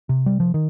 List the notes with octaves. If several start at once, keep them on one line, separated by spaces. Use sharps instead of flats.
C3
G3
F3
D#3